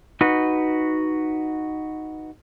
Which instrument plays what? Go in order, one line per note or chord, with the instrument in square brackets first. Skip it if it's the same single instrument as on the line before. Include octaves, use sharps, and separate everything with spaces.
[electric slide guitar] D#4 F#4 B4